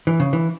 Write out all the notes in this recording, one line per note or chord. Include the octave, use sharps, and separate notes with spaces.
E3
C#3
E3